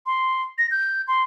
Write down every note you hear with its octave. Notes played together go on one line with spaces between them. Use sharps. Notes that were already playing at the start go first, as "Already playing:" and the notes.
C6
A#6
G6
C6